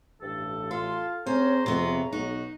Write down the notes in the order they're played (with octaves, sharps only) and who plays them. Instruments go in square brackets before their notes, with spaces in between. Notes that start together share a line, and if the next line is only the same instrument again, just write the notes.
[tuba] A1 [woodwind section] G2 A4
[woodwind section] F4 [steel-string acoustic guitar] A4 [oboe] C6
[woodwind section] C#3 C#5 A#5 [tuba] C4 [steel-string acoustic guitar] C#4 [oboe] C5
[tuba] F2 [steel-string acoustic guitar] C3 B3 [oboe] C6
[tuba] B1 [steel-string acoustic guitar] D#4 [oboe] F#4